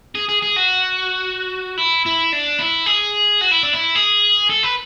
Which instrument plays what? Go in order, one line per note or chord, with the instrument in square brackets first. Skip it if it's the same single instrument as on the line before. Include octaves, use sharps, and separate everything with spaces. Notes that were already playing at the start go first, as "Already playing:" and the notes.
[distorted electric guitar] G#4
G#4
G#4
F#4
E4
E4
D4
E4
G#4
F#4
E4
D4
E4
G#4
A4
B4